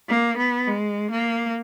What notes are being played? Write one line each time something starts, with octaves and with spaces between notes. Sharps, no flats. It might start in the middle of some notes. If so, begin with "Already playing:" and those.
A#3
B3
G#3
A#3